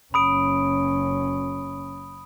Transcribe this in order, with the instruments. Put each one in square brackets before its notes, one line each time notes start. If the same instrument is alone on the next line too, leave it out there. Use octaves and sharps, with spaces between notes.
[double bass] F#1 C#4 [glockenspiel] B5 D#6 D7